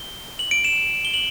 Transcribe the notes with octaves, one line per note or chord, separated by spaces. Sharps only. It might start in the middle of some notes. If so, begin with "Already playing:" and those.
Already playing: G7
F#7
D7
E7
G7
F#7